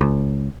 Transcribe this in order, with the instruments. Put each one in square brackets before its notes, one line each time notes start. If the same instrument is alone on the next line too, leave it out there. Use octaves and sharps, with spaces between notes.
[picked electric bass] C#2